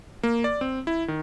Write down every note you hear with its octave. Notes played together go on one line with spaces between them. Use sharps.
A#3
D5
C4
E4
D#3